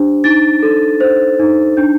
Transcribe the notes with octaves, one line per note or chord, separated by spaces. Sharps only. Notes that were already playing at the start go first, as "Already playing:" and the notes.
Already playing: D4 G4 C5
D#4 A6
A4
C5
D#4
D4 G6